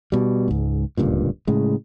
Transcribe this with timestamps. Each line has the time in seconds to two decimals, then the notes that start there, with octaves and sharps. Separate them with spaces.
0.12 B2 G3
0.48 C#2 G#2
0.97 D1 C#2 G2 A#2
1.47 A2 C#3 G#3